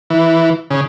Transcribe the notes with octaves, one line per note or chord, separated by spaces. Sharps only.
E3
C#3